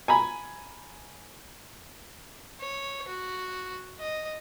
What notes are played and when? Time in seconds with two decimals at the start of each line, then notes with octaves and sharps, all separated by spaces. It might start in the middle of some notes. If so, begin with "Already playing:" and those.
0.08 G#5 A#5 B5
2.60 C#5
3.08 F#4
3.99 D#5